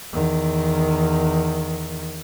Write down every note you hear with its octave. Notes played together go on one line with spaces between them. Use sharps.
E2 D#3